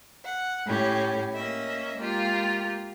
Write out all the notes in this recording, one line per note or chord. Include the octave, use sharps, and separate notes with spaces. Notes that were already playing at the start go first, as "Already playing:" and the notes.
F#5
A2 C#4 G4
A#3 C#4 D#5 E5
G#3 A#3 F4 G4